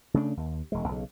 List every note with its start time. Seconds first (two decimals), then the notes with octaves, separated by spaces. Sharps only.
0.14 C#3 A3 C4 D4
0.37 D#2
0.72 E1 G#3
0.88 B1 C#3